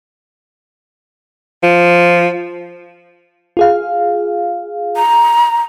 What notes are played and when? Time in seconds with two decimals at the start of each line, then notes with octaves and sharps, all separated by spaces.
1.63 F3
3.57 F4 G#4 F5
4.96 A#5